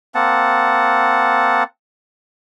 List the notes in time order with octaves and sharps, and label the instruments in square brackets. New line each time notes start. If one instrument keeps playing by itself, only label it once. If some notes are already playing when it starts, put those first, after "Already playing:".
[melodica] A#3 C4 F#5 A5